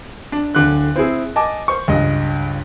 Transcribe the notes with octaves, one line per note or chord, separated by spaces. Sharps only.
D4
D1 D3 F#6
C4 E4 G#4
D#5 G#5 A5 D6
C5 C#6
C#2 G2 D#5